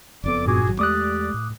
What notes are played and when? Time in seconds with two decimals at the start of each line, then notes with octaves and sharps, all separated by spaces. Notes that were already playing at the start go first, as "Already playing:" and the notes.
0.24 F#1 F2 B3 A4 D5 D6
0.46 G2 A#2 F#4 G#4 D6
0.67 G#1 F#3
0.79 E2 G#3 A3 G4 D5 D6 D#6 F#6
1.34 A2